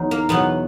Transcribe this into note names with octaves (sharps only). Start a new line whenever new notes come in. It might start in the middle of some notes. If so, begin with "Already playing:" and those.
Already playing: E2 F#3 D#4
A#3
E2 B2 F#3 B3